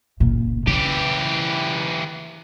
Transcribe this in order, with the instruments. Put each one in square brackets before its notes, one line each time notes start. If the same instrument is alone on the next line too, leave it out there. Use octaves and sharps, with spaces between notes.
[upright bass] F#1 A#2
[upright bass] C#3 [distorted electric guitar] E3 G4